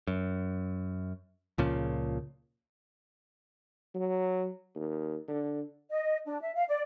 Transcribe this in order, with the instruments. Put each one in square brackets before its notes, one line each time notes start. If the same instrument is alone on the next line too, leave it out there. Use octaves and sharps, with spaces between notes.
[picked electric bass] F#2
C#2 A#2 C#3 F3
[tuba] F#3
D#2
D3
[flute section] D#5
D4
E5
F5
D5